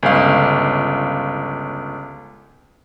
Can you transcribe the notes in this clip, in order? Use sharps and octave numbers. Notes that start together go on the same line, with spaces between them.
G1 C#2 F5